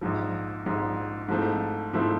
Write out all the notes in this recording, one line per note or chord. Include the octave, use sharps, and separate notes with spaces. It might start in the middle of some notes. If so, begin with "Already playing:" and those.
A#1 G#2 F3
A#1 G#2 F3
G#2 F3 A3 C4 E4
G#2 F3 A3 C4 E4